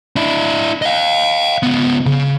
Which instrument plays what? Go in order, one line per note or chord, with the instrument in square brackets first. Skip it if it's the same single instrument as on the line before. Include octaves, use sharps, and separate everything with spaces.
[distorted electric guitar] D4 E4
D#5 F5
C#2 B3
C#3